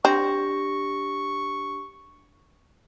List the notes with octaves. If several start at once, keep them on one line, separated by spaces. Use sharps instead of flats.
C4 D4 G4 C#6 A#6